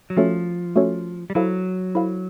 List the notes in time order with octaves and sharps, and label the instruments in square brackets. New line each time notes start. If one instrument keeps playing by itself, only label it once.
[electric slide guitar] F#3
[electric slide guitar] F3 [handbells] A3 C#4 F#4 A4 C#5
[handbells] A3 C#4 F#4 A4 C#5
[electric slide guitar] G3
[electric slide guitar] F#3 [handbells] E4 A4 C5 F5
[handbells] E4 A4 C5 F5